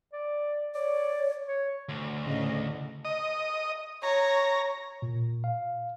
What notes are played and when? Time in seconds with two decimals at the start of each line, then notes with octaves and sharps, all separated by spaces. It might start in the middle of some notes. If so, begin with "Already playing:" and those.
0.13 D5
0.75 C#5 D5
1.48 C#5
1.89 D2
2.24 A2 C#3 D#5
3.05 D#5
4.03 C#5 A#5
5.02 A#2
5.44 F5